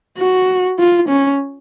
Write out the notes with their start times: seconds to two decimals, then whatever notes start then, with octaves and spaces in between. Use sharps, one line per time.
0.18 F#4
0.79 F4
1.09 C#4